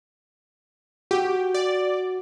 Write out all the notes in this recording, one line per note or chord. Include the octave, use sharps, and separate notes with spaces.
F#4 G4
D5